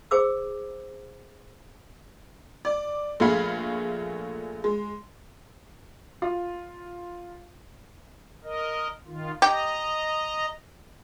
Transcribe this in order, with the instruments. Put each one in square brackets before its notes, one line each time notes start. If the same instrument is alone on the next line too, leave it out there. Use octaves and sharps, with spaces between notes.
[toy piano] G#4 C5 D6 E6
[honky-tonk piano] D5
A#1 A3 G#4 F5 B5
G#3
[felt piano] F4
[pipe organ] A#4 D#5
D#3 F4
[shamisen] G4 [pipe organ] D#5 A#5